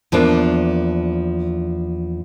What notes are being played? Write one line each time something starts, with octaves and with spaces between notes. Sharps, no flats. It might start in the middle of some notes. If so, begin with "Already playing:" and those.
E2 F3 A#3 D4